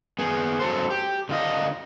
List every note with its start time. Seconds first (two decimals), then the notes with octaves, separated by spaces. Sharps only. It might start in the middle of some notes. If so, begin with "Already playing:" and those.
0.19 B3 G#4
0.60 F#3 A4 C5
0.90 G4
1.29 D3 F4 D#5